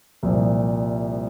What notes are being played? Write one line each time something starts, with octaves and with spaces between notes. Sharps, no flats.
C2 A#2 F3